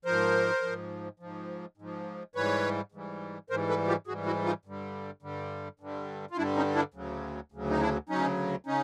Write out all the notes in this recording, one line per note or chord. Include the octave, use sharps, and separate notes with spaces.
G#2 F3 A#4 C5
G#2 F3
G#2 F3
G#2 F3
G#2 E3 G3 B4 C#5
G#2 E3 G3
G#2 E3 G3 A#4 C5
A4 B4
F4 G4
G#2 E3 G3 F#4 G#4
E4 F#4
D#4 F4
G2 D3 G3
G2 D3 G3
G2 D3 G3
F4
G2 D3 G3 D4 E4
C#4 D#4
D4 E4
D2 C#3 F#3
D2 C#3 F#3
D#4
D4 E4
D2 C#3 F#3 C#4 D#4
C#3 C#4 D#4